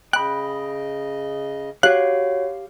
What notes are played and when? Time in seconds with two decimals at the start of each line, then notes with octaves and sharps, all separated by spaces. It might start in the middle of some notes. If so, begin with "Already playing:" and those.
0.13 C#3 D#5 G5 B5 F#6
1.83 F#4 G4 C#5 F5 F#6